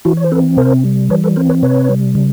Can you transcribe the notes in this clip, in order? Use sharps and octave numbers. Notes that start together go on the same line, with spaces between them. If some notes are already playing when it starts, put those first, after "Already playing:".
E3 E4 F#4
C#5
C5
C4 A4 B4
C3 A#4 C5
G3
E3 B4 C#5
A4 B4
C4 A#4 C5
B4 C#5
C3 B4 C#5
G3
C#3